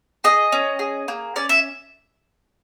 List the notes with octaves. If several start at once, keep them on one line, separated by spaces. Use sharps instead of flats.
G#4 D#5
C#4
G#4
A#3
C#4 D5
E5